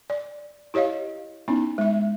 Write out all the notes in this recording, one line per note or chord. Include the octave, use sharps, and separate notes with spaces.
D5
E4 G4 C#5 D#5 F5
B3 C#4 D#4 E4
G#3 E5